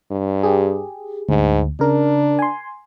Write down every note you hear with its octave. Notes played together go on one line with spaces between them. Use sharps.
G2
G4 G#4
D2 G#2
C#3 D4 A#4
G#5 C6